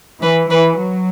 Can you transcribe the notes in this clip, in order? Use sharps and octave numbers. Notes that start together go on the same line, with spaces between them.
E3 B4
E3 B4
F#3